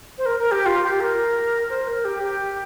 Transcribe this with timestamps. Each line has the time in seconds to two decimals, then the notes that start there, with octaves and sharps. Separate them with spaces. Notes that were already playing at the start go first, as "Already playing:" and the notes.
0.18 C5
0.26 A#4
0.40 A#4
0.51 G4
0.66 F4
0.83 G4
1.00 A#4
1.70 C5
1.87 A#4
2.05 G4
2.23 G4